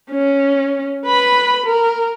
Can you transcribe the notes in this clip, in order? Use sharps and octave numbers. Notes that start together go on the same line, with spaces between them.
C#4
B4 B5
A#4